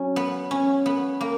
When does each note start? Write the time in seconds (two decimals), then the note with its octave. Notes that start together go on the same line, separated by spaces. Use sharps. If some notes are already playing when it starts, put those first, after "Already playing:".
Already playing: F#3 C#4
0.16 B3
0.51 C#4
0.86 B3
1.21 A#3